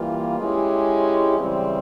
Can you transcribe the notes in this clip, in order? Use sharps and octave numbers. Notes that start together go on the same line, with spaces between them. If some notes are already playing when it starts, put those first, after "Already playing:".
Already playing: E3 G3 A#3 F4
G#3 C#4 E4 G4
C#3 E3 G3 C4